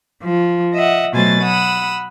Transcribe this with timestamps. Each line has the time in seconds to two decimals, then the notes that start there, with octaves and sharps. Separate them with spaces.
0.22 F3
0.73 D#5 E5 F#5
1.13 B2 F#3 A3 C5 G#5 A6
1.42 F#5 B5 D#6 E6